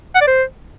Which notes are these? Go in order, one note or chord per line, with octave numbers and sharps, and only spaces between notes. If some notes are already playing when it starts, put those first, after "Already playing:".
F#5
D5
C5